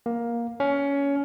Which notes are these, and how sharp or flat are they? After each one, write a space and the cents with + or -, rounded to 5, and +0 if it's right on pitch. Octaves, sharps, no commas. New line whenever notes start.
A#3 +10
C#4 +20